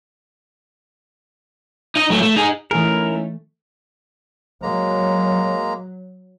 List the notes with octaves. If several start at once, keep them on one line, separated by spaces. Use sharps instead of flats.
D#4 D#5
F#3 A3
A3
D#4 G#4
E3 A3 C#4 D#4 E4 G#4 A#4
F#3 G#3 A#3 A#5